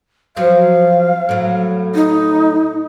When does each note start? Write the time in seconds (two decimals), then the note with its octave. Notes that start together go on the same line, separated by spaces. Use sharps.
0.37 F3 F#3 C4 F5
1.29 A2 F#3
1.95 D#4